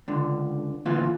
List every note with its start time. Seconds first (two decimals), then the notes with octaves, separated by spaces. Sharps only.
0.08 C#2 D3
0.85 D2 A#2 E3 F4